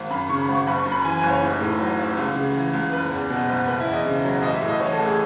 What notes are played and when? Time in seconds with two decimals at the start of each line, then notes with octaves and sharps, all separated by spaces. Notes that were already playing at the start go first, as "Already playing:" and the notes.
Already playing: G#1
0.10 F#2 B5
0.29 C#3 C#6
0.42 B5
0.48 G#1
0.55 C#6
0.67 F#1 B5
0.79 C#6
0.86 F#2
0.92 B5
1.04 E3 G#5
1.17 G#5
1.23 F#1
1.29 C#5
1.42 A1 D#4
1.61 A2
1.80 F#3
1.99 A1
2.17 C#2
2.36 C#3
2.55 E3
2.73 C#2
2.92 F#1 B4
3.11 E2
3.30 B2
3.49 F#1
3.67 F#1 B4
3.80 E4
3.87 E2
3.92 D#5
4.05 C#3
4.24 F#3
4.42 A1 D#5
4.55 E5
4.61 A2
4.68 D#5
4.80 E3 C#5
4.93 A4
4.99 A1
5.05 G#4